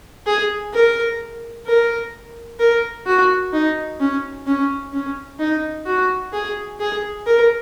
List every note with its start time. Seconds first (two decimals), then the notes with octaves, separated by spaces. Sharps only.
0.26 G#4
0.73 A#4
1.66 A#4
2.59 A#4
3.06 F#4
3.53 D#4
4.00 C#4
4.47 C#4
4.93 C#4
5.39 D#4
5.86 F#4
6.33 G#4
6.80 G#4
7.27 A#4